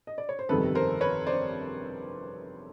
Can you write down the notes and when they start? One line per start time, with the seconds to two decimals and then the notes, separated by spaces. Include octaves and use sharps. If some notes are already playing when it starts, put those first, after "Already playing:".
0.07 D#5
0.18 D5
0.29 C#5
0.39 C5
0.49 G1 F2 C3 D#3 G3 A4 B4
0.75 A#4 C5
1.01 B4 C#5
1.27 C5 D5